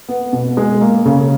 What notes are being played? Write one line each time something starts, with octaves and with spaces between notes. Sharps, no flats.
B3
B2
G#3
A#3
C#3